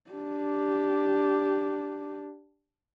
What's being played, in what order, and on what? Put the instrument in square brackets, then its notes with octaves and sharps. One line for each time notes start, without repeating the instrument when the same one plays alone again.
[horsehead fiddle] D4 G4